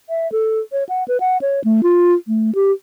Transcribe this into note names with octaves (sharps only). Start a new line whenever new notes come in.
E5
A4
C#5
F#5
B4
F#5
C#5
A3
F4
A3
G4